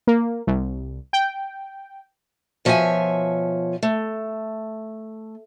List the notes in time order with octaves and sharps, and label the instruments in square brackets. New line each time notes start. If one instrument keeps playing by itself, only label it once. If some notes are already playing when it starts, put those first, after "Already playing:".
[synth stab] A#3
C2
G5
[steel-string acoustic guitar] B2 F3 C#5 D#5 E5 G#5
A3